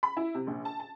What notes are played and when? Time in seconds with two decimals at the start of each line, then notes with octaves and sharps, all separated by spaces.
0.03 B5
0.17 E4
0.35 C3
0.47 A#1
0.65 A5
0.80 A5